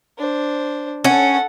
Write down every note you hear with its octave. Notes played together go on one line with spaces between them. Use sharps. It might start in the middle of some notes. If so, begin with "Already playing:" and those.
D4 C5
C#4 A4 F#5